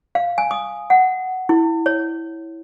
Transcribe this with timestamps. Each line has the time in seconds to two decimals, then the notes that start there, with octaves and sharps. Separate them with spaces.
0.15 F5
0.38 G#5
0.51 D#6
0.90 F#5
1.49 E4
1.86 C#5